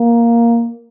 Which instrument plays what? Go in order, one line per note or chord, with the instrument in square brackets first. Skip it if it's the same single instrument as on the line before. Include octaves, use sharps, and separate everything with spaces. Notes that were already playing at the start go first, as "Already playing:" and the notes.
Already playing: [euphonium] A#3